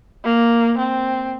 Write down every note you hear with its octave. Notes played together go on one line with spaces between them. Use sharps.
A#3
C4